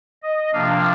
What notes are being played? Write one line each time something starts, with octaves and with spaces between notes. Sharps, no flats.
D#5
C3 F3 A#3 D4 F5